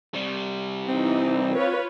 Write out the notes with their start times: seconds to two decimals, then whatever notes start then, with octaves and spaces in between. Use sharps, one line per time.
0.14 C3 G3
0.89 E3 C4 D#4
1.54 F4 B4 C#5